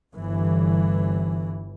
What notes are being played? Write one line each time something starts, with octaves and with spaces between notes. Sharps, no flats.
G1 E3